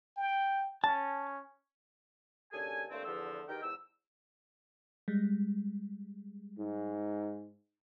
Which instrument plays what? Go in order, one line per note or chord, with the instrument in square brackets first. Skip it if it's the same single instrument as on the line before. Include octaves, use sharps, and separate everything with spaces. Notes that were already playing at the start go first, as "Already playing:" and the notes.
[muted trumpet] G5
[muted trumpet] C#4 [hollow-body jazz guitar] A5
[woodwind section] D#2 C#3 D4 A4 G#5
G2 D3 A3 A#3 C4
E2 D3 F3 E6
E2 D#3 D#4 G4 A#4 G5
E2 G#2 E6
[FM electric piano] G3 G#3
[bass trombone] G#2